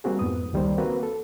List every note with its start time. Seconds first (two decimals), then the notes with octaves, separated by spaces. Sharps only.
0.04 G3 A#3 C4 F#4 G#4
0.19 F2 G#2 B3 D#6
0.53 C#2 D#3 G3 A#3 C5
0.78 A#3 C4 F#4 B4
1.03 A4